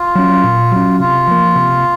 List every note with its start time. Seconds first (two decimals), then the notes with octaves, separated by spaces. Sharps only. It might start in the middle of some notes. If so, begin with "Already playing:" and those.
Already playing: F4
0.15 F#3 C#4
0.44 A#2
0.72 F#3 C#4
0.99 C3 F4
1.27 F3 A#3
1.55 C3